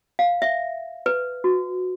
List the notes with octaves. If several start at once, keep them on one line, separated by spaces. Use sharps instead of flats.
F5
E5
B4
F#4